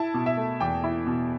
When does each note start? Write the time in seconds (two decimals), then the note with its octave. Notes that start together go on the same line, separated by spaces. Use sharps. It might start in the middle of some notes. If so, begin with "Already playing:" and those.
Already playing: E4 A5
0.14 B2
0.26 E5
0.38 A3
0.60 E2 G5
0.84 E4
1.07 B2